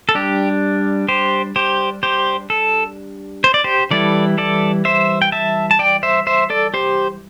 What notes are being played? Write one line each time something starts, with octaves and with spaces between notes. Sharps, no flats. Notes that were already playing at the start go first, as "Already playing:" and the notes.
A4
G3 D4 G4
G4 C5
G4 C5
G4 C5
A4
C5
D5
G4 C5
E3 G3 E4 A4 D5
A4 D5
C5 E5
G5
E5 A5
A5
D5 G5
C5 E5
C5 E5
A4 D5
G4 C5